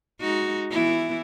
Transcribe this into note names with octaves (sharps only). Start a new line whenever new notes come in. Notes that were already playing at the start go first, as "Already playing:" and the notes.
G#3 D#4 F#4
E3 B3 E4